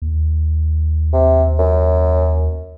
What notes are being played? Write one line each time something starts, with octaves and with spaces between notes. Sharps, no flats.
D#2
C3
F#2